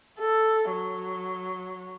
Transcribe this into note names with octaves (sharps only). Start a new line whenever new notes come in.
A4
F#3